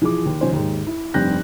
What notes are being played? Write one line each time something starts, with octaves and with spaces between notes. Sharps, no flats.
E3 F3 G#4 D6
D#2
D#3 F3 C#4 C5
D#2 G#2
E4
F1 G2 C4 F#6 G6 A#6